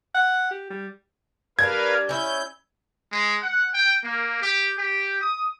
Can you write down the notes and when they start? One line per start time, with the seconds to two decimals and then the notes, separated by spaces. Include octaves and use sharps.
0.15 F#5
0.51 G4
0.70 G3
1.59 G3 D4 A#4 B4 F5 G#6
2.09 C#4 E4 G6
3.12 G#3
3.42 F#5
3.74 G5
4.04 A#3
4.42 G4
4.78 G4
5.21 D#6